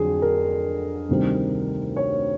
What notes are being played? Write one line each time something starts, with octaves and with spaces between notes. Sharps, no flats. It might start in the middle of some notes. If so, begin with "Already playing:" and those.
Already playing: F2 D3 F#3 G#4
A#4
D2 C3 D#3 G3
C#5